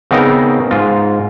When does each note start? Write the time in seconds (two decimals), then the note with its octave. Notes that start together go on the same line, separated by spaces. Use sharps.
0.11 C#3 B3 C4 D#4 A#4
0.71 G#2 F4